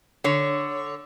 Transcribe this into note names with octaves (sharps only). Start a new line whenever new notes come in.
D3 C#5